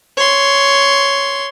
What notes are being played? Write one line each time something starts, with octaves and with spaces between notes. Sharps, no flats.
C#5 C6